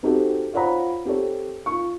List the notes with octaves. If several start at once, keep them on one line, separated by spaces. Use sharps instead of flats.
C4 D#4 F#4 G4 A4 C5
F4 C5 C#5 F#5 A#5 B5
C4 G4 A4 C#5
F4 C#6